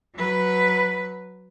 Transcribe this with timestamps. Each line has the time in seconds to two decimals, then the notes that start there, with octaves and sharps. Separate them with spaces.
0.15 F#3 B4